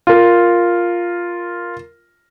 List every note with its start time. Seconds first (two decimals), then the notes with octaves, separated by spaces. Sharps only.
0.07 F4 A#4